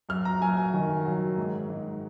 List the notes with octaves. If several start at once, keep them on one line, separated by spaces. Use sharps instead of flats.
F#2 F6
A#5
F#2 G#5
G#5
D#3
F#3
G#2
G#2